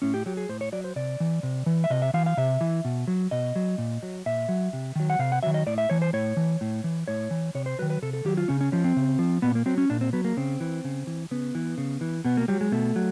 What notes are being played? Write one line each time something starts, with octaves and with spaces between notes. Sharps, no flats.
A2 C#4
G4
F#3 G4
G#4
A2 C5
C#5
F#3 D5
C5
C3 D5
E3
C3
E3
E5
C3 D#5
E5
E3 F5
F5
C3 E5
E3
B2
F#3
B2 D#5
F#3
A#2
F#3
A#2 E5
F#3
C3
D#3 F#3
F#5
C3 F5
F#5
D#3 F#3 E5
D#5
A2 D5
E5
E3 C#5
C5
A2 C#5
E3
A2
E3
A2 C#5
E3
C3 C#5
C5
D#3 F#3 B4
B4
C3 A4
A4
D#3 F#3 G4
F4
C#3 C#4
C#4
F3 C#4
C4
C#3
F3
A#2 B3
A#3
F#3 C4
C#4
A#2 D4
C4
F#3 B3
A#3
C#3 C4
E3
C#3
E3
C#3 B3
E3
C#3
E3
B2 B3
A#3
F#3 G3
G#3
B2 A3
F#3